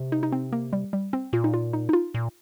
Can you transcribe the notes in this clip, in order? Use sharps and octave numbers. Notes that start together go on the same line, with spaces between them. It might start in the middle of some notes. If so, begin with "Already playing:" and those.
Already playing: C3
D#4
D#4
C4
A#3
G3
G3
C4
A#2 F4
D#4
F4
D#4
D#4
F4
A#2